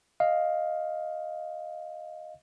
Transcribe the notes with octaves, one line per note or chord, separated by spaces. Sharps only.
D#5 F5